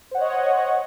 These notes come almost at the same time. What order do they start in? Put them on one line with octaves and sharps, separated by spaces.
C5 F#5 C#5 D#5